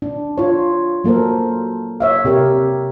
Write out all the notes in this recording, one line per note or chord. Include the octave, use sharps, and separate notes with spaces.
D4
F4 C#5
F#3 A#3 A4 A#4 C5
C#5 E5 F5
C3 G4 A#4 C#5